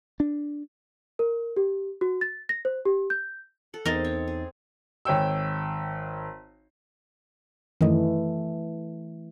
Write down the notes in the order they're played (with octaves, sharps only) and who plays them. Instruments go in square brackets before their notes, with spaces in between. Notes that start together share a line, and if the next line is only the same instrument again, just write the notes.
[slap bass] D4
[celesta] A#4
G4
F#4
A6
A#6
C5
G4
G6
[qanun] A4 F#5
[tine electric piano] E2 D#4 A6 [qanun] C4 C5 [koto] A#4 D#5
[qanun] C4 C#5
G#4
[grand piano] G#1 C#5 G5 E6
[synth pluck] F#2 D#3 D#5 [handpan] E3 A3